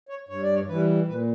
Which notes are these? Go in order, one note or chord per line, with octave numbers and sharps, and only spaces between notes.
C#5
G2 C#5
D5
C#5
E3 G3 B4
A#2 B4